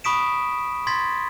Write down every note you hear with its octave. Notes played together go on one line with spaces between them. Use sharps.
B5 C#6 D#6 B6 D7 E7
C6 G#6 A6 B6